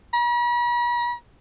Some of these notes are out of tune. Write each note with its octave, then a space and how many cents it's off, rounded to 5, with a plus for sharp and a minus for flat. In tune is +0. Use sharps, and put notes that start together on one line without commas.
B5 -45